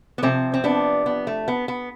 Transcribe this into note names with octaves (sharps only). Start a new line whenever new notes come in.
B3
C3 F3 A3 C4
C4
B3 D4
B3
A3
B3
B3